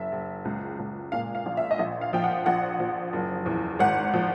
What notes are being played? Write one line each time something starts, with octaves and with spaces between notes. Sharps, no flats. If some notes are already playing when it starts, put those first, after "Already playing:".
Already playing: F#1 E5
F#1
C#2
C#2
A#2 F5
F5
A#1
E5
D#5
A#1 E5
F5
F3 G5
F#5
A#1 F#5
F3
F#1
E2
G#1 F#5
F3